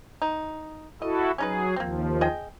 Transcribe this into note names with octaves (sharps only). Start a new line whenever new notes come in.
D#4
E4 F#4 A4 D#5
F#3 C#4 D#4 G#4 B4
D#2 F3 A#3 C4
G#4 D#5 G5